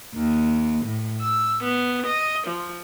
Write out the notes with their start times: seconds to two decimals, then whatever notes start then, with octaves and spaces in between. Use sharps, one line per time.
0.15 D#2
0.84 A2
1.20 E6
1.63 B3
2.06 D#5
2.47 F3